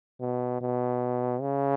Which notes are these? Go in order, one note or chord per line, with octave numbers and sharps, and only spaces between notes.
B2
B2
C#3